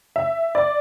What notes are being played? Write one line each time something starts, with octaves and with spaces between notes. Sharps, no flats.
E5
D5